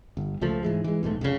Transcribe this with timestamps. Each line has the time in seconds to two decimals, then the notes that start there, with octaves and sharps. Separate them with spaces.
0.17 G1
0.41 C#2 F3 A3
0.63 G#2 E3 G#3
0.84 E3 G#3
1.03 B1 G#2 G3 A3
1.21 F1 G#2 C#3